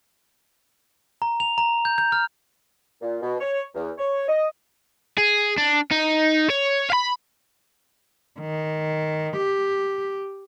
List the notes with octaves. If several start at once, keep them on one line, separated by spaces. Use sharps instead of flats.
A#5
F7
A#5
G6
G6
F6
A#2
B2
C#5
E2
C#5
D#5
G#4
D4
D#4
C#5
F5 B5
D#3
G4